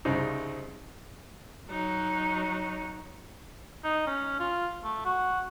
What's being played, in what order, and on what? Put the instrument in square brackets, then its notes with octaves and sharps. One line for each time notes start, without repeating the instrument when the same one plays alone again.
[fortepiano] C2 C#3 C4 D#4
[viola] F#3 D#4
[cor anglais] D#4
C#4
F4
A3
F#4